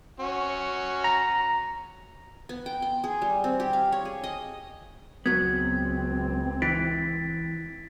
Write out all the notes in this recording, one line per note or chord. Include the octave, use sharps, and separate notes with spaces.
C#4 F#4
A#5
B3
G5
C6
G#4
G3
C4
G4
F5
C#5
G#4
D#5
C#2 F#3 B3 C4 G#6
E3 A6 B6 D7